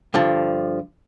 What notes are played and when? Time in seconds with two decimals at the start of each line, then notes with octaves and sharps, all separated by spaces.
0.14 G2 D3 F3